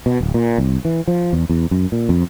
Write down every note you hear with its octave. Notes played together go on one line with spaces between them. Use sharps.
B2
D1
A#2
C2
E3
F3
E2
E2
F#2
A#2
F2